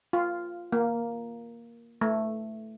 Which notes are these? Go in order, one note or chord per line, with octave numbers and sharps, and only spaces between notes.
F4
A#3
A3